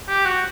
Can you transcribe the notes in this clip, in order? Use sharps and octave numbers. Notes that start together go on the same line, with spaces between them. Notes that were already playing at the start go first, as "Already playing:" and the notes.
G4
F#4